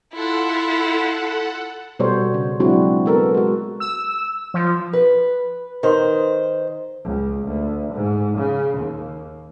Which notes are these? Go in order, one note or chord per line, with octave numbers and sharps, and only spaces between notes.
E4 F4 A4 F#5
B2 G3 F#4 A4 C5 C#5
C#3
F#3 G#3 C4 D4 E4 F#4
B3 A4 A#4
G#3 F#4
E6
F3
B4
D#3 C5
C#2
D2
G#2
C#3
D#2